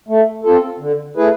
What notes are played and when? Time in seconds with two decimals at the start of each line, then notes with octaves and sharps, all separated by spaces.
0.09 A3
0.44 C4 F4 A4
0.80 D3
1.17 A3 E4 G#4 B4